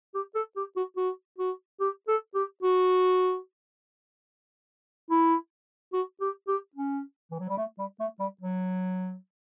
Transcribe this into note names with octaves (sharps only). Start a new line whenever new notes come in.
G4
A4
G4
F#4
F#4
F#4
G4
A4
G4
F#4
E4
F#4
G4
G4
C#4
E3
F#3
G3
A3
G3
A3
G3
F#3